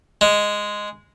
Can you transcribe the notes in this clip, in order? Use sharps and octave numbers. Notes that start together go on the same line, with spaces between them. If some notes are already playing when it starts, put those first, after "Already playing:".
G#3